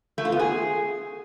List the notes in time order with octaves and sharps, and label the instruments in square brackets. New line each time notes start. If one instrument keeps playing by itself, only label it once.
[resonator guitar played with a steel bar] A3
F4
B3
G#4